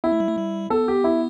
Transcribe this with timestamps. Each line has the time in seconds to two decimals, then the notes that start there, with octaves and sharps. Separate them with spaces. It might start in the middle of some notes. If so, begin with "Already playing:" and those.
0.04 B3 E4
0.12 A3
0.20 G3
0.28 A3
0.38 G3
0.70 B3 A4
0.88 G4
1.04 E4